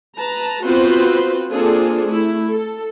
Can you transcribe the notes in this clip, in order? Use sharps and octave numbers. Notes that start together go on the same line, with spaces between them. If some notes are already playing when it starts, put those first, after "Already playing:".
B4 A5 A#5
B3 C4 F4 F#4 B4 C5
A#3 C4 D4 F4 G#4 A4
A3 E4
A4